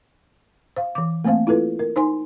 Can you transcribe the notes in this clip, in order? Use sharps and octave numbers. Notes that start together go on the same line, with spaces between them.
C5 F5
E3 D6
A3 A#3 C4 C5 F5
E4 F4 A4 B4
A#4
D#4 C5 G#5 C6